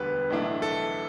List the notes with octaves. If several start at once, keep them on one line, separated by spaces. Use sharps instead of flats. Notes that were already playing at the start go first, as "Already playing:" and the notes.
Already playing: E1 D2 D3 G3 B3 B4
B1 A2 E3 A3 D4
A4